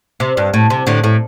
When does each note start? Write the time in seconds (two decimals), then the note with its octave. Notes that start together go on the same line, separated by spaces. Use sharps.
0.20 C3
0.37 G2
0.54 A2
0.70 C3
0.87 A2 D3
1.04 A2